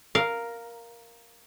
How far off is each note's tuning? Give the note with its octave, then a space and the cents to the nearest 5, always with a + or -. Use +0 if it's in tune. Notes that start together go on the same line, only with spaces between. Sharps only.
A#4 +0 F5 +0